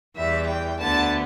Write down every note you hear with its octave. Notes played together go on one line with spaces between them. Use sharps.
E2 E3 G3 E5
G5
D2 D3 B3 A5